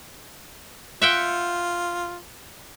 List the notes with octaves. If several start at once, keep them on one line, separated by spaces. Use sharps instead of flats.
F4 E5 F#5 G5